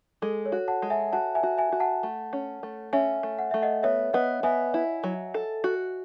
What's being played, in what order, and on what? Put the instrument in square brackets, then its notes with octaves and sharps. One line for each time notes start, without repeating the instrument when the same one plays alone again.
[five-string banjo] G#3 [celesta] A4
[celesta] C#5
[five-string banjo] F#4
[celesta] F#5 A5
[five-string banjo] G#3
[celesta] E5 G#5
[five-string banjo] F#4 [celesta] F#5 A5
[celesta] E5 G#5
[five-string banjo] F#4
[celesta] E5 G#5
[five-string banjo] F#4
[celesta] F#5 A5
[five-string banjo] A3
C#4
A3
[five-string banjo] C#4 [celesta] E5 G#5
[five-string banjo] A3
[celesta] F#5
[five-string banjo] A3 [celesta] E5
[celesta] D#5 F#5
[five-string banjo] B3 [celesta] C#5 E5
[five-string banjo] B3 [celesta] D#5 F#5
[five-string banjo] B3 [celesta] E5 G#5
[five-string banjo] E4
F#3
A4
F#4